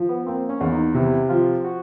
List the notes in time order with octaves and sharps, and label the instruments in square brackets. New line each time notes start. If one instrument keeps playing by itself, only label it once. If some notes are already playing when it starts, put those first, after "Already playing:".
Already playing: [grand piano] F3
[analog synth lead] B3
[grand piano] A#3 [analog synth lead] C4
[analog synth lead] C#4
[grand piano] E2
[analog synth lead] D#4
[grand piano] C3 [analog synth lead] E4
[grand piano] F3 [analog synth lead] F4
[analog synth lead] F#4